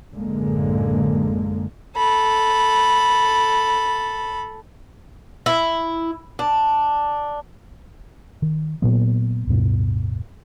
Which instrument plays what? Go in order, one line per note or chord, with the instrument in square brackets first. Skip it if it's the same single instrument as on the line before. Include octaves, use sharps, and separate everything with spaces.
[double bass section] A1 F#2 D3 G#3 A#3
[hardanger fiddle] A4 B5
[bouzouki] E4
D4
[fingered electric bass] D#3
A#2 F#3 A#3 B3
D1 G2 B2